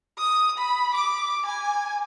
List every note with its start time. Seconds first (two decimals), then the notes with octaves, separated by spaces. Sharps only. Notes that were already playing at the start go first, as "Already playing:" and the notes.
0.19 D#6
0.58 B5
0.94 D6
1.46 G#5